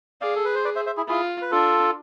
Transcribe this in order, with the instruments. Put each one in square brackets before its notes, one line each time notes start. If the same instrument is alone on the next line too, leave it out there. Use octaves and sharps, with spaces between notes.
[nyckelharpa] G#4 [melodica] D5 F5
[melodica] A4
B4
C5
B4 D5
C5 E5
C5 E5
E4 G#4
[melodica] E4 G#4 [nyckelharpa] F4
[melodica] B4
[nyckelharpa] D4 [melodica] F4 A4